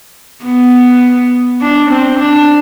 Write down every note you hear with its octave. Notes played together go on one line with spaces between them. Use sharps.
B3
D4
C4
D4